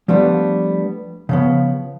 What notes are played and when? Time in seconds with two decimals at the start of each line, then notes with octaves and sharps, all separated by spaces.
0.08 F3 G3 A3 B3 D4
1.29 C#3 F3 B3